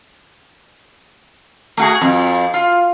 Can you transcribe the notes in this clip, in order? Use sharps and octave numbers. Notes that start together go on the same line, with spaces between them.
A3 F#4 G#4
F2
F4